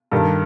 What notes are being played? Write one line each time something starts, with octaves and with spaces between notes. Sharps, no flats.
G2 D#3 A4